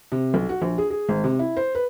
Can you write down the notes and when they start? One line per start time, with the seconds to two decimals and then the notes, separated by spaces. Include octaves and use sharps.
0.12 C3
0.34 B1
0.49 F#4
0.62 A#1
0.78 G#4
0.90 G#4
1.09 G#1
1.24 C3
1.39 E4
1.57 C5
1.75 B4